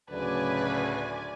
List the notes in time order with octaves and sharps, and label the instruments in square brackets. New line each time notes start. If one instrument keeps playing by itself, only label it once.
[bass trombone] D2 [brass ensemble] A2 C#3 F#3 [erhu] B4 [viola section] D5 G#5